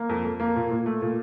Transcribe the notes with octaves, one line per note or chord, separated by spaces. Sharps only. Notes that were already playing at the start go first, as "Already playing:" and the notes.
Already playing: A#3
F2
F2
A#3
A#2
A#2
A3
A#2